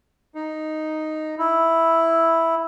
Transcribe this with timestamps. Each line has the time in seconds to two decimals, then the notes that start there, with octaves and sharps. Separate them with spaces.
0.35 D#4
1.38 E4